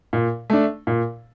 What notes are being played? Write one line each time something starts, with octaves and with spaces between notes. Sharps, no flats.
A#2
A3 D4
A#2